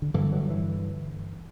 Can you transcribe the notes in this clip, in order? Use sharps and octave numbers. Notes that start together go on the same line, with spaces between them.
D3
G2 D3 E3
F#3
E3